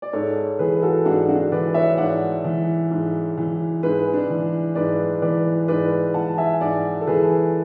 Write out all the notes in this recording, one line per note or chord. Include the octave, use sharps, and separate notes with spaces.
D5
G#2 A4 C#5
E3 G#4 B4
F#4 A4
G#2 D4 F#4
D4 F#4
E3 B4 D5
C#5 E5
G#2 D5 F#5
E3
G#2
E3
G#2 G#4 B4
D4
E3
G#2 B4 D5
E3 B4 D5
G#2 B4 D5
E3 F#5 A5
E5 G#5
G#2 D5 F#5
A4
E3 G#4 B4